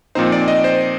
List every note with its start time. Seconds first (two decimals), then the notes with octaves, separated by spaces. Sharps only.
0.15 A#2 F3 C4 D#4 C5
0.32 D5
0.48 D#5
0.64 C5